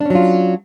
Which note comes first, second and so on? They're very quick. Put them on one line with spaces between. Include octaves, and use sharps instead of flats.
D4 C#4 F#3 F4